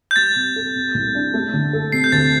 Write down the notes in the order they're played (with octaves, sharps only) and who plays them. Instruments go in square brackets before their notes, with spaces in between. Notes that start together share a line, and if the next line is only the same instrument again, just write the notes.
[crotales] G6
[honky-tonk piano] G3 [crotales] A6
[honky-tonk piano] C3
A4
C3
C2
D4
A3
D3
A4
[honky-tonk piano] C3 [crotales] C7
[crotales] G6
[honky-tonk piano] D2 [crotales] A6